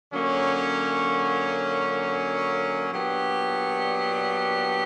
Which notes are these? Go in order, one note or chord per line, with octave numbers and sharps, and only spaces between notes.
D3 F#3 A#3 C#4
A#2 F#3 B3 D4 G4